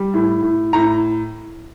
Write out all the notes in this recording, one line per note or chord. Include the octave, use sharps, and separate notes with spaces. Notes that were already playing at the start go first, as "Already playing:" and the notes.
Already playing: G3
A2
A2
A2 A#5